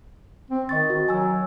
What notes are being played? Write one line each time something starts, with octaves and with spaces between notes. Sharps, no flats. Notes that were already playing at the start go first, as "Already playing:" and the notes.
C4
D#3 D#5 C#6 A6
F#4
F#3 G#5 E6